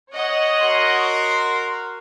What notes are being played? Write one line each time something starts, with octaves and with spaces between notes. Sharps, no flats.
C#5 D#5 F#5
F#4 A#4 C6